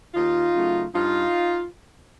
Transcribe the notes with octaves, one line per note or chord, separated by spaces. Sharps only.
D#2 D#4 F4
C#3 F#3 A3
G2 D#4 F4